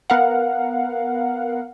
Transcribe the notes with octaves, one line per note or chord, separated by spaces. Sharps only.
B3 A#4 F5 F#5